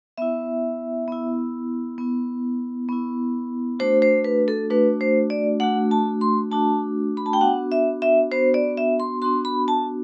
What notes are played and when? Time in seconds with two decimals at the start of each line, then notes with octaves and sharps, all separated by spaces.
0.18 B3 E4 E5
1.08 B3 E4
1.98 B3 E4
2.89 B3 E4
3.79 A3 D4 F#4 C5
4.02 C5
4.24 B4
4.48 A4
4.70 A3 D4 F#4 B4
5.01 C5
5.30 D5
5.60 A3 D4 F#4 F#5
5.91 A5
6.21 C6
6.51 A3 D4 F#4 A5
7.17 B5
7.26 A5
7.33 G5
7.41 B3 D4 F#4 F#5
7.72 E5
8.02 E5
8.31 B3 D4 F#4 C5
8.54 D5
8.77 E5
9.00 C6
9.22 B3 D4 F#4 C6
9.45 B5
9.68 A5